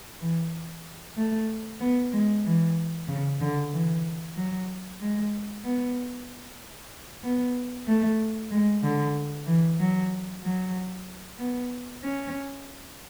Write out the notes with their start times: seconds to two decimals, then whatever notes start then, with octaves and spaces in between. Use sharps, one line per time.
0.21 E3
1.17 A3
1.80 B3
2.13 G#3
2.45 E3
3.08 C#3
3.41 D3
3.72 E3
4.36 F#3
5.01 G#3
5.64 B3
7.23 B3
7.87 A3
8.51 G#3
8.83 D3
9.47 E3
9.80 F#3
10.43 F#3
11.38 B3
12.03 C#4